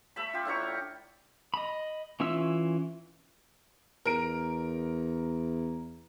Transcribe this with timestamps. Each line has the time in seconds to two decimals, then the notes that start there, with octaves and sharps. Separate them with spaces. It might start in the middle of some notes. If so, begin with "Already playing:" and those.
0.16 A3 E5 B5
0.33 F4 G4
0.45 A2 D4 A#5 C#6
1.54 D#5 B5
2.20 E3 C#4 F4 E5 E6
4.05 E2 A#4 D7